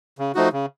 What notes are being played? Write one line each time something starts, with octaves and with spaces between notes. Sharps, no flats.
C#3
F3 A3 D#4 F#4
C#3